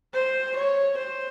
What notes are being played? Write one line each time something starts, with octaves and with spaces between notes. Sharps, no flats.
C5
C#5
C5